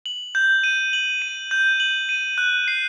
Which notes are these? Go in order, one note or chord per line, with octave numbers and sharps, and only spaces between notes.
F#7
G6
D#7
F#7
D#7
G6
F#7
D#7
F#6
C7